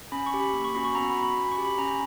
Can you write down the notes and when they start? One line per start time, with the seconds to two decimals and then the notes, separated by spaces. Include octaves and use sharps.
0.12 C#4 B5
0.26 C#6
0.34 G4
0.40 B5
0.54 A#3
0.64 C#6
0.75 C#4 F#4 B5
0.85 C#6
0.95 B3 A#5
1.10 B5
1.16 F#4
1.23 B5
1.37 C#4 B5
1.52 C#6
1.58 G4
1.65 B5
1.78 C#4 A#5